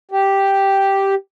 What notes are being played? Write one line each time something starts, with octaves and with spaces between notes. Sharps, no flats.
G4